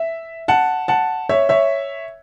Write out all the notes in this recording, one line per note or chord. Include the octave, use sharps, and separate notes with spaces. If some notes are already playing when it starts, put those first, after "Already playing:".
Already playing: E5
F#5 A5
F#5 A5
C#5 E5
C#5 E5